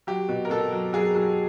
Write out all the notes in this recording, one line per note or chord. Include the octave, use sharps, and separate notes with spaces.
F#3 G4
B2
A#4
B2 A4
F#3
F#3 G#4
F#3